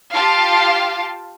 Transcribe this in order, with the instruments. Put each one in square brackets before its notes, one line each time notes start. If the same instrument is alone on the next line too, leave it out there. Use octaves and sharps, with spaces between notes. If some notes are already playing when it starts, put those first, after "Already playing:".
[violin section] F4 G4 F5 A5